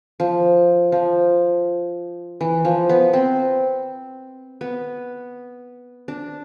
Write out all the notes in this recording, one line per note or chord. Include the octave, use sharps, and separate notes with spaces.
F3
F3
E3
F3
B3
C4
B3
D4